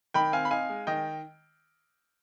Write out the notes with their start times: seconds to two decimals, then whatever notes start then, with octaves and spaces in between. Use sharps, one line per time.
0.14 D#3 G5 B5
0.32 C4 F5 G#5
0.45 B5
0.51 D#4 F5 G#5
0.70 G#3
0.87 D#3 D#5 G5